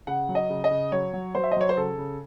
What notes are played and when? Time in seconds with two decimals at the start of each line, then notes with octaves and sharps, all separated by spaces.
0.07 C#3 F#5
0.29 F#3
0.35 D#5
0.50 C#3
0.64 D#5
0.71 C#3
0.92 F#3 C#5
1.13 F#3
1.35 F#3 C5
1.44 E5
1.52 D#5
1.56 F#3 C#5
1.69 C5
1.77 C#3 A4
1.98 C#3